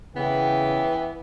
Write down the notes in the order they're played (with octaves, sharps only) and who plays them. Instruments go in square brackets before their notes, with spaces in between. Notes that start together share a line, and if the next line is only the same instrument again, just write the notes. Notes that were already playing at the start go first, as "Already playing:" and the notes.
[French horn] C#3 [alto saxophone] E3 [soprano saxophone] B3 [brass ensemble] G5